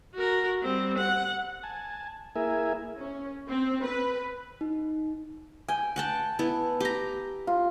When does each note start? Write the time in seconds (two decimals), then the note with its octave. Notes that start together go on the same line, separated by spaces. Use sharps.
0.15 F#4 A#4
0.62 G3 C4
0.98 F#5
1.63 G#5 A5
2.36 A#3 E4 G#4 A#4 E5 G#5
2.98 C#4
3.48 C4
3.83 B4
4.61 D#4
5.68 G5 G#5
5.96 F#5 G5 A5
6.39 B3 E4 A4
6.80 G4 A#5
7.47 F4